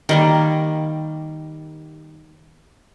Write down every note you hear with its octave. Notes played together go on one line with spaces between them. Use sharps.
D#3 G3 A#3